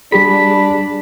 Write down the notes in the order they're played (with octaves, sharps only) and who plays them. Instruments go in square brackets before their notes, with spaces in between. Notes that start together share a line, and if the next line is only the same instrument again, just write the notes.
[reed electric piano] G3 G4 G#4 [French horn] D4 [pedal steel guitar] B5